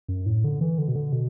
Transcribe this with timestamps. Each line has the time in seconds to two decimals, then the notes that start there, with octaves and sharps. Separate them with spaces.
0.09 F#2
0.26 A2
0.44 D3
0.61 E3
0.78 D3
0.88 B2
0.95 D3
1.12 B2